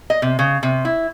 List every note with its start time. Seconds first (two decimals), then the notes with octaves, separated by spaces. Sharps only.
0.10 D#5
0.22 C3
0.39 C#3
0.63 C3
0.85 E4